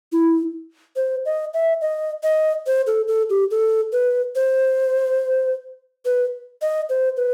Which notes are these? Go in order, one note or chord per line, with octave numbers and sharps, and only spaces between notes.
E4
C5
D#5
E5
D#5
D#5
C5
A4
A4
G4
A4
B4
C5
B4
D#5
C5
B4